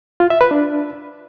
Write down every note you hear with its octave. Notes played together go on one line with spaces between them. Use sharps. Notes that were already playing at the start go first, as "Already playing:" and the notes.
F4
E5
B4
D4